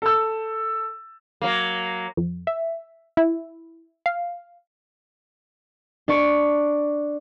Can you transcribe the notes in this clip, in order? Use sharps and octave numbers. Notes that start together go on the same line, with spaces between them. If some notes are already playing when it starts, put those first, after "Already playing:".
A4 E6
F#3 A#3
F2
E5
E4
F5
D4 D5 C#6